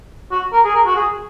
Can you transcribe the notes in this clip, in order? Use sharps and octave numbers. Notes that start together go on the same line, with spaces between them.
F#4
A#4
G#4
A#4
F#4
G#4